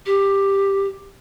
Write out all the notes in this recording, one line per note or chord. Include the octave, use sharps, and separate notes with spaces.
G4